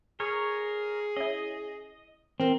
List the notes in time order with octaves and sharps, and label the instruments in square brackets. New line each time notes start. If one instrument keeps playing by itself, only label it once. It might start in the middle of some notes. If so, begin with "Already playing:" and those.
[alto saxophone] G#4 [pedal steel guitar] A#4 C#5
[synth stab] C#4 E4 [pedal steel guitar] D#5
[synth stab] E3 A#4 [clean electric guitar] C4